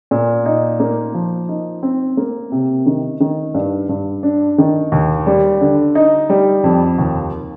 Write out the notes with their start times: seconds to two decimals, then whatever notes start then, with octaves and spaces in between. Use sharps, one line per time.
0.11 A#2
0.46 D#4
0.80 A#3
1.14 F3
1.49 D#4
1.83 C4
2.17 A#3
2.52 C3
2.86 D#3
3.20 D#3
3.54 G2
3.89 G2
4.23 D4
4.58 D#3
4.92 D#2
5.27 G3
5.61 D3
5.95 D#4
6.30 G3
6.64 F2
6.98 D#2